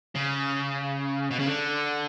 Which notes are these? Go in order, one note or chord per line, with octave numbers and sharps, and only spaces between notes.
C#3
B2
C#3
D3